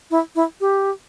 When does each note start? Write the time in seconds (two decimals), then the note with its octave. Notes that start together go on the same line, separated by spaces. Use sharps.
0.11 E4
0.35 E4
0.61 G4